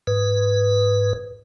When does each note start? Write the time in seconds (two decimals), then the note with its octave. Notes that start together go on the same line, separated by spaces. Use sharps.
0.07 G#2 B4